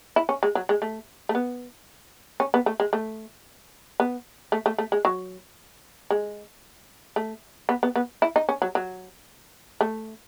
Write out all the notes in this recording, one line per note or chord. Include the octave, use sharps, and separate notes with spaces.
E4
C#4
G#3
F#3
G#3
A3
A3
B3
C#4
B3
A3
G#3
A3
B3
A3
A3
A3
G#3
F#3
G#3
A3
B3
B3
B3
E4
D#4
C#4
F#3
F#3
A3